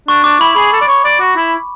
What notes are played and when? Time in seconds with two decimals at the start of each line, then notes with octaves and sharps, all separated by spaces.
0.08 D4 C#6
0.24 D4 D6
0.40 E4 B5
0.56 G#4 B5
0.73 A4
0.81 D5
0.88 C#5
1.04 D5
1.20 F#4
1.37 E4